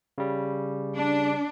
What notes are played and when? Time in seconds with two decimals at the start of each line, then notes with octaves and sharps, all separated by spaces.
0.18 C#3 G3
0.96 D4